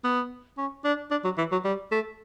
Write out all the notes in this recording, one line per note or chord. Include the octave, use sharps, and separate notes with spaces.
B3
C#4
D4
D4
F#3
E3
F#3
G3
A3